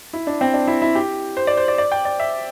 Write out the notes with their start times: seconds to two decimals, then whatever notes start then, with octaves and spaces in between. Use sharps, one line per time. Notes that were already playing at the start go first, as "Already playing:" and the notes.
0.13 E4
0.27 D4
0.41 C4
0.54 D4
0.67 E4
0.82 E4
0.95 G4
1.37 C5
1.47 D5
1.57 C5
1.68 D5
1.78 D5
1.92 G5
2.05 D5
2.20 E5